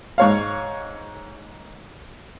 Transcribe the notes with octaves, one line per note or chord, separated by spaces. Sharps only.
G#2 C#5 F5